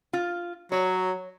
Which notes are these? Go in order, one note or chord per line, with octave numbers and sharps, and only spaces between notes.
F4
F#3 C#5